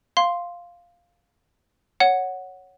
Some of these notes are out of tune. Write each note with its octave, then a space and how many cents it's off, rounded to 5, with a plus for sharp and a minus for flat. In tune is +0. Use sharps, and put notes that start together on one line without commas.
F5 +0 C6 +0
C#5 +0 F#5 +0